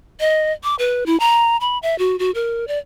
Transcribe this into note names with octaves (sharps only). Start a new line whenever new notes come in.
D#5
D6
B4
E4
A#5
B5
E5
F#4
F#4
A#4
D5